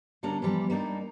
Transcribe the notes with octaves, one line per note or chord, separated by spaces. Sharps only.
D3 G3 A#3 C#4 D4 A#5
E3 F3 G3 B3
G3 A#3 D4 D#4